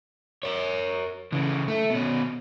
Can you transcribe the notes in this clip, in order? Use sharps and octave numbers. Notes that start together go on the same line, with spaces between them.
A#4 C#5
C#3 E3
A3
B2 C#4